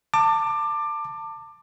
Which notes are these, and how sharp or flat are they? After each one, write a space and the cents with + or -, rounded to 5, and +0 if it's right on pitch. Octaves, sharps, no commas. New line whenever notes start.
A5 +25 D6 +20